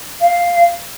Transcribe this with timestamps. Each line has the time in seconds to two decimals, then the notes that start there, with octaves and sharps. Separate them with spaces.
0.21 F5